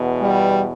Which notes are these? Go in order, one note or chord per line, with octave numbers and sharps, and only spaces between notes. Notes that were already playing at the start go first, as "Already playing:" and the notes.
Already playing: E2 B2
G3